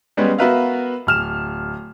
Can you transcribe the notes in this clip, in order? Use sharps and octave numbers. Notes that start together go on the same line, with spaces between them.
G3 G#3 B3 C#4
B3 F#4 A#4 B4 E5 F5
D1 F6 E7